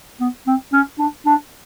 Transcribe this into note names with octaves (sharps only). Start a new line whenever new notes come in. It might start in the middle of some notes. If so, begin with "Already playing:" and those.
B3
C4
C#4
D4
D4